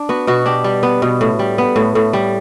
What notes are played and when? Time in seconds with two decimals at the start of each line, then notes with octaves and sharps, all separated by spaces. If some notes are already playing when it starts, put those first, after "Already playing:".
Already playing: D4
0.09 B3 F#4
0.27 B2 F#4
0.46 D4 G4
0.64 G3
0.83 B3
1.02 B2
1.21 A2
1.39 G3
1.58 B3
1.76 A2
1.95 A2
2.13 G3